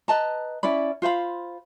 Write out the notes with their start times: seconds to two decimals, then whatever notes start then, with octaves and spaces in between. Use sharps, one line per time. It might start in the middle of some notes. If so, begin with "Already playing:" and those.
0.08 B4 D#5 A5 A#5
0.63 C#4 E4 D5 B5
1.02 F4 C5 F5 B5